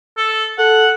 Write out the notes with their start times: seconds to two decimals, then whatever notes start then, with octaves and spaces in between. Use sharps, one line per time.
0.17 A4
0.58 A4 F#5